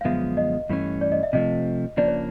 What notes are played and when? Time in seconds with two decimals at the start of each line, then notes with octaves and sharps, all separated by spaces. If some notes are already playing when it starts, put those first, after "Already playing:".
0.01 F5
0.05 F#2 D3 F3 G#3 B3 E5
0.37 D#5
0.69 G2 E3 A3 C#4
1.01 D5
1.12 D#5
1.23 E5
1.33 C3 F3 A3 D#5
1.97 C#3 F3 A#3 D4 D5
2.08 C#5